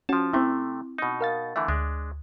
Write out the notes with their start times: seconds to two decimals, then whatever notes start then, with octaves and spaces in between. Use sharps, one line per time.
0.09 F3 C#4 F#4 A5
0.33 C3 A3 C4 E4
0.98 B2 D#4
1.21 A#4 F5 A6
1.56 D3 E3 A3 E5
1.68 D2 G#3 D4